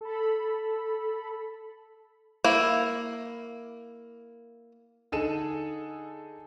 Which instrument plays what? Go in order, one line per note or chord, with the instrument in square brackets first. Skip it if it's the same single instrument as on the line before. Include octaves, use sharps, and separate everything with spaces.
[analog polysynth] A4 B5
[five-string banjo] A#3 E4
[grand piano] D3 D#4 G#4 A4 D#7 E7